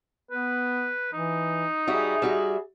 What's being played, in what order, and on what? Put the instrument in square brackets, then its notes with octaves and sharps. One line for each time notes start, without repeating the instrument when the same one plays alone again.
[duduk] B3 [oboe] B4
[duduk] E3 [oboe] D#4
[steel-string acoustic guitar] G3 F#4 E5 [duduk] G#4
[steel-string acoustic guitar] G3 F#4 E5